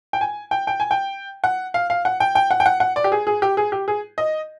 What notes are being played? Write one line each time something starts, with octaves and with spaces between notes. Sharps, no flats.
G5
G#5
G5
G5
G#5
G5
F#5
F5
F5
F#5
G5
G5
F#5
G5
F#5
F#5
D5
G4
G#4
G#4
G4
G#4
G4
G#4
D#5